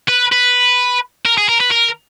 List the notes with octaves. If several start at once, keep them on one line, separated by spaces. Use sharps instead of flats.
B4
B4
A#4
G#4
A#4
B4
A#4